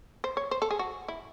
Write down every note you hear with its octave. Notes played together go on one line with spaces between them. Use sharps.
C5
C#5
C5
A4
G#4
F#4
E4